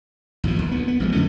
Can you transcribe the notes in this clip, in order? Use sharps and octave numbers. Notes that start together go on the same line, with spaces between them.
A1 E2 G2 F3
D#2
D2 B3
B3
A1 F3 G#3
F2 D3 A3 C#4